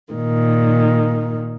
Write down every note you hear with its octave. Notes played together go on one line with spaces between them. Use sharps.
A#2 D#3